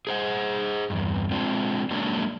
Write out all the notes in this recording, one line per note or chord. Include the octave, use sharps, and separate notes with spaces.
G#4 C5 F#5
E2 G2
G#3 C4 D4 F4
F#3 G#3 A#3 C#4 D4